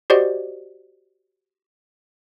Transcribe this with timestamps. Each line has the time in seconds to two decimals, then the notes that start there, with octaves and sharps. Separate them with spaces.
0.10 F#4 G4 C5 D5 D#5